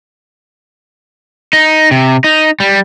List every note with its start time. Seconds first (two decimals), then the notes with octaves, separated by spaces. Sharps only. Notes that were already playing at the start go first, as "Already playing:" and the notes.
1.53 D#4
1.91 C3
2.24 D#4
2.60 G3